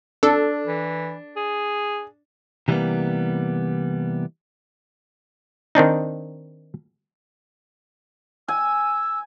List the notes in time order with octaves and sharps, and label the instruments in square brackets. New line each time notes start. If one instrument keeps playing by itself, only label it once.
[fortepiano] D4 [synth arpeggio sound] A4
[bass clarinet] E3
G#4
[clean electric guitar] C3 E3 F#3 G3 A#3 B3
[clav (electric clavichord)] D#3 C4 D4 D#4
[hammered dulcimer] G#5 [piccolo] E6